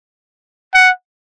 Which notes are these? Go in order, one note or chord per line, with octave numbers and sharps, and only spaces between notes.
F#5